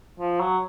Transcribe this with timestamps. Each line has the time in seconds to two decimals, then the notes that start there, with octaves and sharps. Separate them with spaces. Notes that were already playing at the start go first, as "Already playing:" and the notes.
0.20 F3
0.40 F#3